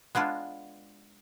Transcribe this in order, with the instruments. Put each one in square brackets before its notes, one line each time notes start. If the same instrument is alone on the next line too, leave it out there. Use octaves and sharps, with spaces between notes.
[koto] G#3 B3 D4 F4